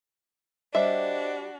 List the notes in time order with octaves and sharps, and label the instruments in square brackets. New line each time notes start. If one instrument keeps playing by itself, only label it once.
[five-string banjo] G3 E5 [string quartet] D4 F#4 [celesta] C5 D#5